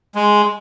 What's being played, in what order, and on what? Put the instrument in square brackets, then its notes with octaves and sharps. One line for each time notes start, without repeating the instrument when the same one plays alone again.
[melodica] G#3